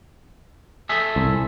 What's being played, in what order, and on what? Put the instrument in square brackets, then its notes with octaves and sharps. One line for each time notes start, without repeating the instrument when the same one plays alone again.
[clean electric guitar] G#4 A4 E5
[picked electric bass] C2